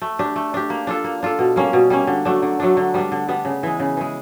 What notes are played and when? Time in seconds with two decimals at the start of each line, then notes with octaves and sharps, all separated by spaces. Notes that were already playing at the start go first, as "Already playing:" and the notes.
0.02 A3
0.19 D4 G4
0.36 A3
0.54 D4 G4
0.70 A#3
0.87 D4 F4 A4
1.04 A#3
1.23 D4 F4 A4
1.39 B2
1.56 G3 A#3 C#4
1.73 B2
1.90 G3 A#3 C#4
2.07 D3
2.25 F#3 A3 D4
2.42 D3
2.60 F#3 A3 D4
2.77 D3
2.94 G3 B3 D4
3.12 D3
3.28 G3 B3 D4
3.45 C#3
3.63 E3 G#3
3.80 C#3
3.97 E3 G#3